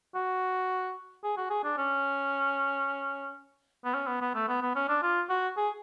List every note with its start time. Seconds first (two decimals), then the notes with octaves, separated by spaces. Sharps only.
0.15 F#4
1.24 G#4
1.37 F#4
1.50 G#4
1.64 D4
1.78 C#4
3.85 B3
3.94 C#4
4.07 B3
4.21 B3
4.35 A3
4.49 B3
4.62 B3
4.76 C#4
4.89 D4
5.03 F4
5.29 F#4
5.57 G#4